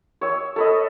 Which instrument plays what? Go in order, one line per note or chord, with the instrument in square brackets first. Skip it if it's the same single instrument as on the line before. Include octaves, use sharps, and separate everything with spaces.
[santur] C#5 E6
A4 B4 D#5